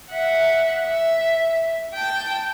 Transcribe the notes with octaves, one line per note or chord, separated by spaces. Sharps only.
E5 F#5
E5
G5 A5